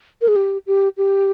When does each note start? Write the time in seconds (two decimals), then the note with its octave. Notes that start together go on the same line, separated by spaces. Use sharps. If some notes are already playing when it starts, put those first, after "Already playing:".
0.22 A#4
0.28 G#4
0.36 G4
0.67 G4
0.97 G4